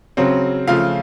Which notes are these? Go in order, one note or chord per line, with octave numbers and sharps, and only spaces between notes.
C#3 F#3 C4
C#3 F3 A3 F4 F5